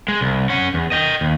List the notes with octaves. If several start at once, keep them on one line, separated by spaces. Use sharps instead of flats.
G#3
C2
C#4 F#5
E2
D#5 G5
D#2